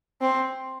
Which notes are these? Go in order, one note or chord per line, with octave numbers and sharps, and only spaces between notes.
C4